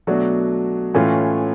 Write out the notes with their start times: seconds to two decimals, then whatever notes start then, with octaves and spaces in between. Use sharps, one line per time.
0.07 B2 F#3 A3 D4 F#4
0.94 A2 E3 A3 C#4 F4